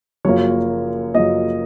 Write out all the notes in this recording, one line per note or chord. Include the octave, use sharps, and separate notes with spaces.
F#1 F#2 F3 A#3 C#5
F#1 F#2 F3 A#3 D#5